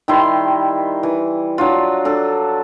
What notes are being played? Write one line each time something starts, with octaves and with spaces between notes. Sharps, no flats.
D#3 G3 E4 C6
E3
F#3 D4 F4
D4 A4